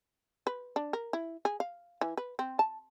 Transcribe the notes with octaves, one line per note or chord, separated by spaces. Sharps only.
B4
D4
A#4
E4
G#4
F5
E3
B4
C4
A5